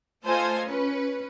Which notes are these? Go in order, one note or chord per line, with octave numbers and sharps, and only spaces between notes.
A3 F4 A4 C5 D#5 G#5
C#4 B4